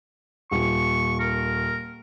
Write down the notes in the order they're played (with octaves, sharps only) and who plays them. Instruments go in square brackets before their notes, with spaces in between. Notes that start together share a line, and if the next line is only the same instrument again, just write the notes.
[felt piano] D#1 [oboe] C#6
[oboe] A#4